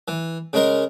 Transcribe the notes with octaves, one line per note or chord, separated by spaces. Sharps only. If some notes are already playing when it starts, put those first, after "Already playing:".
E3
C#3 G#3 A#4